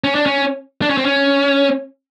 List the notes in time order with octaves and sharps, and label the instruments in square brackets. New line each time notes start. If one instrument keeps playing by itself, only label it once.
[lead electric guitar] C#4
D4
C#4
D4
C#4
C4
C#4